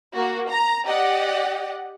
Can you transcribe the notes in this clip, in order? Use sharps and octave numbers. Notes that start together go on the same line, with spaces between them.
A#3 F#4
A#5
G4 D5 D#5 F#5